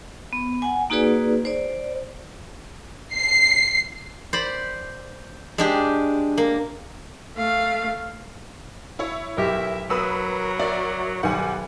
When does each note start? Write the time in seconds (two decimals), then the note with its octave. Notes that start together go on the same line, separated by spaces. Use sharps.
0.33 B3
0.62 F#5 G#5
0.90 A#3 D#4 F#4 G#4 B4 D5
1.45 C5 D5
3.15 C7
4.33 C5 D5 B5
5.58 G#3 D4 G4
6.38 A#3
7.36 A3 F5
8.99 E4 C#5
9.38 B1 G4 A#4 E5
9.90 F#3 A#4 B4 D#6 E6
10.59 F#4 D5 E5
11.23 B1 D#3 G3 F#5 G#5